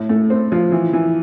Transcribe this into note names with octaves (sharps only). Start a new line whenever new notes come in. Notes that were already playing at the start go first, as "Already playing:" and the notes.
Already playing: A2
A3
C4
F3
E3
E3